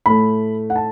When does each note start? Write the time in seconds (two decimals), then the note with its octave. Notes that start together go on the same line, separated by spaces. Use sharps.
0.06 A2 A3 B5
0.70 F#5
0.76 A5